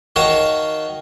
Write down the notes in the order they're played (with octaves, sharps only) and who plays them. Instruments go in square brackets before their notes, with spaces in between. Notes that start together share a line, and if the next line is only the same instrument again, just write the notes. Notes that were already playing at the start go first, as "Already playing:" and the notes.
[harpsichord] D#3 F#4 C#5 F5 A5 A#5